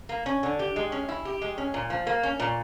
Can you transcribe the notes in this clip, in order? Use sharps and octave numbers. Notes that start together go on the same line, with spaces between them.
A#3
C#4
D3
G4
G#3
C#4
E4
G4
G#3
C#4
A#2
F3
A#3
C#4
A#2